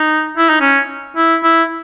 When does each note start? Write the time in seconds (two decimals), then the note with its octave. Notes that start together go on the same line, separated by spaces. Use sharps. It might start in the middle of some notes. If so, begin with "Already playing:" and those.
Already playing: D#4
0.37 E4
0.49 D#4
0.61 C#4
1.17 E4
1.44 E4